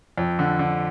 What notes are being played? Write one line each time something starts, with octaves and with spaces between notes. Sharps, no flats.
F2
D3
D3